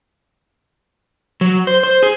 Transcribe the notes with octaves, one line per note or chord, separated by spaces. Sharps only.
F#3
C5
C5
G#4